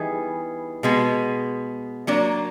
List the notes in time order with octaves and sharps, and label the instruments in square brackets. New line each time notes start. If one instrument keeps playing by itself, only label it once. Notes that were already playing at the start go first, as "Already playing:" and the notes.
Already playing: [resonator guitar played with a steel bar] E3 G3 B3 D#4 G#4
B2 G#3 B3
F#3 A#3 D4